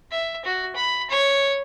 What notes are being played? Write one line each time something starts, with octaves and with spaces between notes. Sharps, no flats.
E5
F#4
B5
C#5